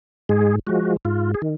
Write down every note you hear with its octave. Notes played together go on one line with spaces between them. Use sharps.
G#2 G#3 G#4
F3 G#3 F#4
G#2 F4
G#4
D#3